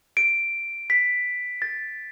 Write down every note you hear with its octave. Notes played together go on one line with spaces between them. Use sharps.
D7
B6
A6